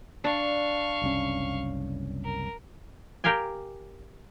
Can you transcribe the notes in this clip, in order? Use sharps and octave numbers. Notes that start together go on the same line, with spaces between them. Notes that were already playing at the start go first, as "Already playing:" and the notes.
D4 F5 C#6
F#1 C2 C#4
A#4
G4 A#4 F5 G5 G#5